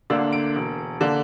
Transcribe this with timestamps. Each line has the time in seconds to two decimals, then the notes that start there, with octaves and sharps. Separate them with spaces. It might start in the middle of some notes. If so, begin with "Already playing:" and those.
0.10 D2 D3 A#3 D4 E6
0.33 D7
0.56 E1
1.01 D3 A#3 D4